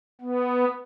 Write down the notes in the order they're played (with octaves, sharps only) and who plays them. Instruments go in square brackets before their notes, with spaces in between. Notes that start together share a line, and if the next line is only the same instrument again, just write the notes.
[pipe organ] B3